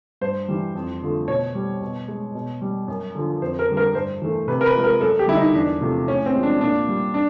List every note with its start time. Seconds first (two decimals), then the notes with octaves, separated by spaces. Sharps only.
0.21 G2 C5
0.48 E3 G3
0.75 F2
1.02 D3 F3 A3
1.28 B2 C#5
1.55 G3
1.81 B2
2.08 G#3
2.35 B2
2.62 G3
2.88 F#2
3.15 D3 F3
3.42 F2 C5
3.59 A#4
3.68 D3 G3
3.77 A#4
3.95 G2 C5
4.22 E3 A3
4.48 C3 B4
4.61 A#4
4.66 B4
4.74 F3 G#3
4.84 A#4
5.01 F#2 A4
5.19 G4
5.27 D3 G3 E4
5.37 D#4
5.55 E2 D4
5.81 C3 F3 A3
6.07 A2 C#4
6.26 C4
6.35 F3 G#3
6.43 D4
6.61 A#2 D4
6.88 G3
7.14 D4